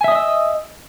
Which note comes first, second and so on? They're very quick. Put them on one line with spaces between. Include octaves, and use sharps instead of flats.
G#5 E5 D#6 D#5 E6